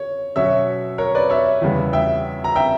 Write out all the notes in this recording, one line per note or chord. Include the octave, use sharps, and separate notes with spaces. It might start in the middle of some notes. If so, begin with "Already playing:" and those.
Already playing: C#5
B2 F#3 C#4 C#5 E5
A#4 C#5
B4 D5
C#5 E5
E2 C#3 G3 B3
E5 G5
A#5
E5 G5